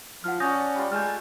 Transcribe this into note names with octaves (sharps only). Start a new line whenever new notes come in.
F3 F#5 F6
C#4 F#4 D5 A5 D#6 G6 A#6
G3 F4
G#3 A3 F6 G6